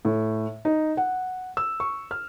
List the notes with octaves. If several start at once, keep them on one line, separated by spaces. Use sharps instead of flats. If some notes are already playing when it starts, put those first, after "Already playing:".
A2
D#4
F#5
E6
C#6
F6